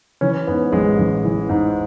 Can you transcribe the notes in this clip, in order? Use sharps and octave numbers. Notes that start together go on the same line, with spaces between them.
E3 C#4
G#2 B3
A1 G#3
A1
E3
G#2